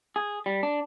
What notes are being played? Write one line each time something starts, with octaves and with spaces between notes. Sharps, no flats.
G#4
G3
D4